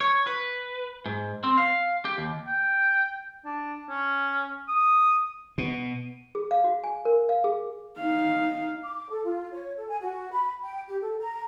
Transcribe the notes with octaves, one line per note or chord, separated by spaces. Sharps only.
C#5
B4
G#2
C4
F5
G4
D#2
G5
D4
C#4
D#6
B2
G#4
F5
F#4
G#5
A#4
F5
G#4
D#4 F5
D6
A4
F4
C#5
A4
G#5
F#4
B5
G5
G4
A4
A#5